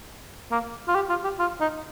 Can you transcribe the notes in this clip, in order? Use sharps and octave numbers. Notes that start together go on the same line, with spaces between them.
A#3
F4
G4
F4
G4
F4
D#4